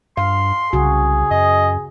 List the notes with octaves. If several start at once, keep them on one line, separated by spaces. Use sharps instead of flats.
G2 F5 C6
C2 C#3 F#4 G#4
F#2 D#5